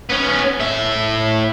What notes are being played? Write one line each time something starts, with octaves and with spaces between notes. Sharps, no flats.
B3 C#4
A2 E5